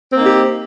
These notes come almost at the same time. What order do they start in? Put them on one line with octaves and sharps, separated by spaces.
C4 A#3 D#4 G4